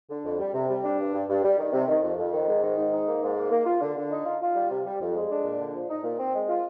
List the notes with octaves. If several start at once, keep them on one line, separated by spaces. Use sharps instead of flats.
D3
F2
G3
C3
G3
D4
G2
G2
G2
G3
D#3
C3
D#3
F2
F2
D#3
G#2
D#3
G#2
D#4
A#3
G#2
A#3
A#3
F4
D3
D3
D#4
F4
F4
G3
C3
G3
F2
G#3
D4
A#2
D3
F3
D#4
A#2
C4
G#3
F4